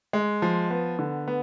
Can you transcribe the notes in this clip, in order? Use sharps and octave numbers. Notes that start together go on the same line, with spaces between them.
G#3
F3
B3
D3
B3